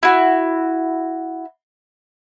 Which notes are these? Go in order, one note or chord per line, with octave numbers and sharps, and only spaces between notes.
E4 F#4